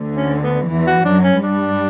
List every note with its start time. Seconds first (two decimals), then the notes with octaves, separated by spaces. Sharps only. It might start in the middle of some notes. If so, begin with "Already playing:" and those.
Already playing: D2 D3
0.17 C#4
0.43 B3
0.67 E2 E3
0.87 F#4
1.05 F#2 F#3 D4
1.24 C#4
1.43 G2 G3 D4